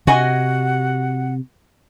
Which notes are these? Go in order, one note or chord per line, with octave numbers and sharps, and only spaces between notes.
C3 F#4 D#5 F#5 G#5